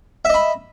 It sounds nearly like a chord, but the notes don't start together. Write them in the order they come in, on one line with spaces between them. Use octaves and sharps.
E5 D#5 B5